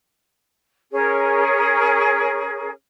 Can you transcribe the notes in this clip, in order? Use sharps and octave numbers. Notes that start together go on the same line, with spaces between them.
C#4 G#4 A#4